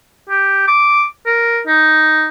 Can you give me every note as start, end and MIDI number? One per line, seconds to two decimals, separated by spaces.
0.29 0.64 67
0.68 1.06 86
1.26 1.60 70
1.67 2.28 63